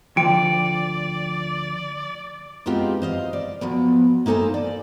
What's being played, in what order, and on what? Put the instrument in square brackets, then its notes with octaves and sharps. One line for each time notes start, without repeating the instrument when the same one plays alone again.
[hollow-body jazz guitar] D2 F3 [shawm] D5 [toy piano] G5 [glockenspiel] D7
[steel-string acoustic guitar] G#3 B3 C4 D#4 F4 G4
C5 D#5 F5
D5
F3 F#3 B3
A#3 D#4 A4 C5 G#5
D5